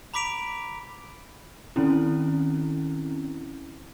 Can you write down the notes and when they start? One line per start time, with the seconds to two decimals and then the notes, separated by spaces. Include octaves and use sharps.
0.14 A#5 B5 D6 B6 D7 F7
1.76 D#3 C4 C#4 E4